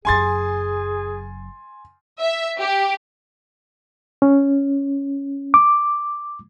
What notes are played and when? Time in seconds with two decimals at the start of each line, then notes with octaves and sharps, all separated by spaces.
0.05 F#1 F#2 G#4 G#5 C6 A6
2.20 E5
2.60 G4
4.22 C#4
5.54 D6